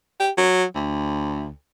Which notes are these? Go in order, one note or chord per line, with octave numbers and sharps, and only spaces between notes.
G4
F#3
D2